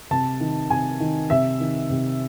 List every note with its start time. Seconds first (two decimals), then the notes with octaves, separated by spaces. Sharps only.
0.11 C3 A5
0.40 D#3
0.70 C3 G#5
1.00 D#3
1.30 C3 E5
1.60 D#3
1.90 C3